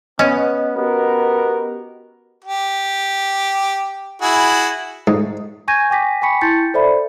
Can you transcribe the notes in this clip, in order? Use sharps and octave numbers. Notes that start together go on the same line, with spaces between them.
B3 C#4 D#5
B3 F#4 G4 A#4
G4
E4 F#4 G#4
G#2
G#5 C#6 G6 G#6 A#6 D#7
G5 G#5 D6 A#6 B6
G5 G#5 B5 C#6 B6 C#7
E4 A5 C6 G6 A6 C#7
A4 C5 D5 E5 B5